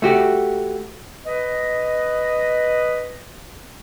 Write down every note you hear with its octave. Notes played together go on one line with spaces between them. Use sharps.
A3 F#4 G4
B4 D#5